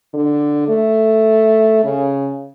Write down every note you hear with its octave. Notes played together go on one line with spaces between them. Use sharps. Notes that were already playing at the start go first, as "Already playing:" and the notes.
D3
A3
C#3